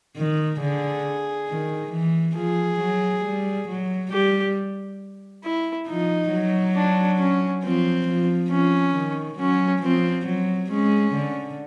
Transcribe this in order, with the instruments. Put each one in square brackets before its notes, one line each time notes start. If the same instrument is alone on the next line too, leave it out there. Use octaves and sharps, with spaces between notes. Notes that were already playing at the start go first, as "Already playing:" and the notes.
[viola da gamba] D#3
[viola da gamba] D3 [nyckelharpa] G#4
[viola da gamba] D#3
E3
[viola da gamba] F3 [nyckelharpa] G#4
[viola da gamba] F#3
G3
F#3
[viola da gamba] G3 [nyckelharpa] G4
[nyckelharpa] E4
[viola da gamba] F3 [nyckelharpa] D#4
[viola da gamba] F#3
[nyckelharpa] D4
C#4
[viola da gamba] F3 [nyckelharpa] C4
[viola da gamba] F3
[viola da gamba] F3 [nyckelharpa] C#4
[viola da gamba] D#3
[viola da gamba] F#3 [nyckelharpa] C#4
[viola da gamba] F3 [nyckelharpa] C4
[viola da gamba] F#3
[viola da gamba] G#3 [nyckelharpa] C#4
[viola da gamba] D3